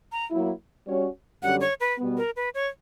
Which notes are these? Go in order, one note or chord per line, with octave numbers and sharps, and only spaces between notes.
A#5
F#3 A#3 E4
G3 C#4 F#4 C#5
F#2 D3 G3 C#4 G4 F#5
C#5
B4
B2 G3 B3
A#4
B4
C#5